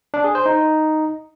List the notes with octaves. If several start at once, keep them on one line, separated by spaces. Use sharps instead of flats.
D4
G#4
C5
D#4